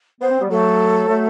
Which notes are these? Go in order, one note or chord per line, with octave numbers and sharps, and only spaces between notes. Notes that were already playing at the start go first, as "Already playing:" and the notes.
B3 C5
C4
G3 B3
F#3 A3 A4
F#3 A3